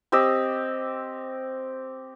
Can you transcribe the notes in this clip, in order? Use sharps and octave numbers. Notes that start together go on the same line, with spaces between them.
C4 G4 D#5 E6